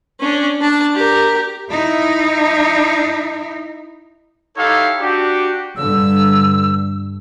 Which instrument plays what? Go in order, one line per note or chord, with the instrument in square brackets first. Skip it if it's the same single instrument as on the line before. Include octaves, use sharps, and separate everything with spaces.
[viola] C#4 D4
D4 A5
G4 A#4
[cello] D#4 E4
[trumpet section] D#4 E4 G4 A4 C#5 F5
D4 F#4 G4
[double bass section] G2 D3 [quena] E6